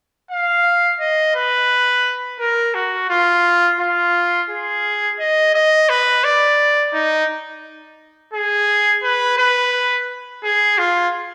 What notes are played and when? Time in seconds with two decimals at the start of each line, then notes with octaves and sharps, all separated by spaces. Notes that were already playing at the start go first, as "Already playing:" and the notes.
0.31 F5
1.00 D#5
1.35 B4
2.40 A#4
2.75 F#4
3.10 F4
3.80 F4
4.50 G#4
5.19 D#5
5.55 D#5
5.89 B4
6.24 D5
6.94 D#4
8.34 G#4
9.03 B4
9.38 B4
10.43 G#4
10.78 F4